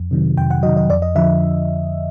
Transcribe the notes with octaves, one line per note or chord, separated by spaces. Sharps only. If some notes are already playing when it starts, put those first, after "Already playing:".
Already playing: F2
C3 D#3 F#3
F2 G5
F#5
C3 D#3 F#3 D#5
D#5
F2 D5
D#5
D3 F3 E5